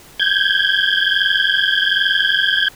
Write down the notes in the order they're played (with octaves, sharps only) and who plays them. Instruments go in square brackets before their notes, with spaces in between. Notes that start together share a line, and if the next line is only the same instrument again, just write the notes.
[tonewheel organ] G6 G#6